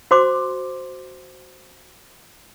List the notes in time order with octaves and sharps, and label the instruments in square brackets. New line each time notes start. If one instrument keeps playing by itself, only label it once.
[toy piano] F#4 C5 C6 D6